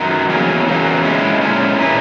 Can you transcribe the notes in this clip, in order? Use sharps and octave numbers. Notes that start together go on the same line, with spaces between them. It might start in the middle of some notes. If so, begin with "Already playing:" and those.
Already playing: F#2 D#3 F#3
E2 C#3 F#3 A#3 C#4
E2 C#3 F#3 A#3 C#4
A#2 G#3 C#4 E4
A#2 G#3 C#4 E4
A#2 A#3 E4 G#4 B4